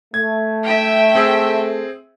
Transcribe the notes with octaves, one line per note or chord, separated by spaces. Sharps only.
A3 G#6
E5 G5
C4 G#4 E6